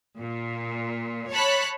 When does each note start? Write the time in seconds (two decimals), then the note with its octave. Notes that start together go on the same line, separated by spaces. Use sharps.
0.18 A#2
1.32 C#5 A5 B5 F#6